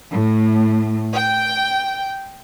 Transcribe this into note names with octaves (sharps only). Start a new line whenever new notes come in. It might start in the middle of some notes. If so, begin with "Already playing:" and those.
A2
G5